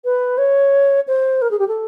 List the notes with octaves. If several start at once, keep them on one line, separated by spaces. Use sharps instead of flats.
B4
C#5
C5
A#4
G#4
G4
A4